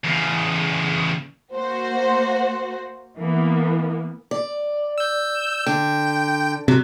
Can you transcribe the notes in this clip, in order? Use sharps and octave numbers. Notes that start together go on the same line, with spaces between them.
E2 C#3
A#3 F#4 C5
E3 A#3 B3
D5
E6 G6
D3 G5
C3 F#3